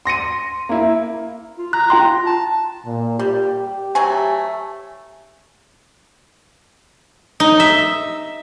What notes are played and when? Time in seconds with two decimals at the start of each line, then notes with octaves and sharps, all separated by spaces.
0.05 C6 A#6 C#7 D#7
0.69 A#3 E4
1.58 F4
1.73 A#5 F#6
1.90 F4 G5 C6
2.26 A5
2.86 A#2
3.19 G3 G4
3.95 F#3 A3 G#5
7.40 D#4
7.60 E5